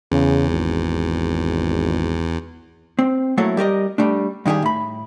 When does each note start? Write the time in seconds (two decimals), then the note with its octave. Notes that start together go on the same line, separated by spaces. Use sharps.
0.12 E2 C#3
0.50 G#1
2.99 C4
3.37 F#3 A3 A#3 E4 A4 C#5
3.57 G3 G4 A#4 D#5
3.98 G3 A3 D4
4.46 G2 D#3 E4 G4 G#4
4.62 A2 B5